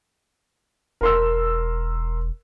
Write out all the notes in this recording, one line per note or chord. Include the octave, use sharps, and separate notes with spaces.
E1 A#4 C6 E6